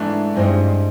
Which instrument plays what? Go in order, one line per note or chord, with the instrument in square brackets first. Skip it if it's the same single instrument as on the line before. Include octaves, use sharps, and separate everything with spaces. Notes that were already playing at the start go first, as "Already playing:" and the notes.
Already playing: [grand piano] G#2 E3 A3 D4
[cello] G2 [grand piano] E3 G#3 C4 D#4